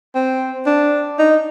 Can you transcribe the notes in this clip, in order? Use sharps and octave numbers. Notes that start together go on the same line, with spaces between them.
C4
D4
D#4